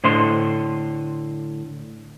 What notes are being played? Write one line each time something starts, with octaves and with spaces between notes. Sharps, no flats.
A2 D3 C5 D#5 C6